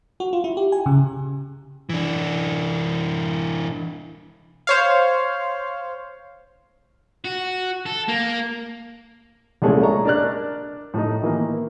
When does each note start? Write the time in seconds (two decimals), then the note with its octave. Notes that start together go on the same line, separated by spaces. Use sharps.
0.20 F#4
0.33 F4
0.44 E4
0.57 G4
0.72 G#5
0.86 C#3
1.90 E3 D4
4.67 C5 C#5 F5
7.25 F#4
7.86 A4
8.08 A#3
9.62 C2 A#2 G#3 A3 C#4 E4
9.83 D#5 A#5 C#6
10.05 D4 A#4 D5 F6 F#6
10.94 A2 D#4
11.22 D#3 E3 A#3